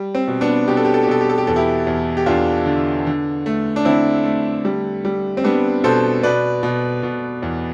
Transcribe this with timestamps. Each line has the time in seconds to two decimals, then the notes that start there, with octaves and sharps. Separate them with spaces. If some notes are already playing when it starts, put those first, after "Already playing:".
Already playing: G3
0.15 C4
0.28 B2
0.41 B3 D4
0.68 B2 G4
0.77 A4
0.85 G4
0.94 A4
1.03 G4
1.07 B2 A4
1.21 G4
1.30 A4
1.38 G4
1.47 E2 A4
1.56 E4 G4
1.87 E2
2.17 G4
2.26 E2 D4 F4
2.66 D3
3.07 D3
3.46 A3
3.76 D4
3.85 D3 C4 E4
4.25 A3
4.65 G3
5.05 G3
5.37 C4
5.44 G3 B3 D4
5.84 B2 A4 C5
6.23 B2 B4 D5
6.63 B2
7.03 B2
7.42 E2